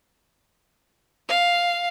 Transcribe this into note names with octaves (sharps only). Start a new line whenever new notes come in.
F5